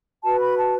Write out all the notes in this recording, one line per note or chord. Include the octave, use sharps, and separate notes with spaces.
F#4 B4 A5
B5
A5